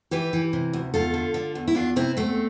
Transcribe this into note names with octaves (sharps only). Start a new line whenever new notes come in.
E3 G4 B4
E3
C3
D2
E2 F4 A4
D3
D3
E2
E4
E2 D4 F4
C3 C4 E4
E2 A3 C4